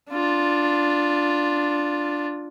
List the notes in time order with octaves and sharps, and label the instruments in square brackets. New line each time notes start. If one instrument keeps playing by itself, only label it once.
[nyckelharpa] D4 F4